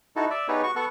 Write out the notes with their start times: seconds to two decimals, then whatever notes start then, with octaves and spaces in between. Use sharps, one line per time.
0.16 D#4 E4 F#4 A4
0.30 D5 E5
0.48 B3 D#4 G4 G#4 B4 C#5
0.63 F#4 C#6
0.76 B3 A4 F#5 C#6